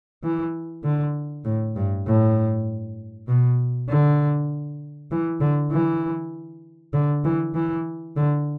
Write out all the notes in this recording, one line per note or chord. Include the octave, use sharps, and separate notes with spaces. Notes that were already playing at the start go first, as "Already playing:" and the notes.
E3
D3
A2
G2
A2
B2
D3
E3
D3
E3
D3
E3
E3
D3